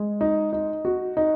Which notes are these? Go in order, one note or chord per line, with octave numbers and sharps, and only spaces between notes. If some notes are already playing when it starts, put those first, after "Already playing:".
Already playing: G#3
D#4
D#4
F#4
D#4